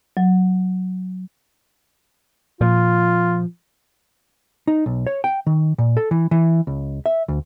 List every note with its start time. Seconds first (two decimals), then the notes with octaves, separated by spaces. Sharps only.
0.17 F#3
2.61 A#2 F3 F4
4.67 D#4
4.86 B1
5.07 C#5
5.24 G5
5.46 D#3
5.78 A#2
5.97 A4
6.11 E3
6.31 E3
6.67 C#2
7.06 E5
7.28 D2